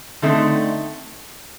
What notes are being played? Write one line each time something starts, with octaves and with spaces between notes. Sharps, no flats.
D3 A3 C4 D#4